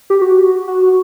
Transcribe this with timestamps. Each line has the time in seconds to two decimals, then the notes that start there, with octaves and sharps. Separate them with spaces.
0.10 G4
0.22 F#4
0.68 F#4